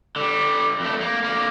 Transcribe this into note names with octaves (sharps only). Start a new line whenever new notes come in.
D3 G3
F2 A3
A#3
D3 A#3